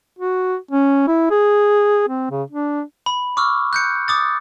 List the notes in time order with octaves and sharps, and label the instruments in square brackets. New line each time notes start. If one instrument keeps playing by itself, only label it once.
[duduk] F#4
C#4
E4
G#4
C4
C#3
D4
[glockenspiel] B5
C#6 D6 E6 F6
F#6 G6 C#7
D6 D#6 A6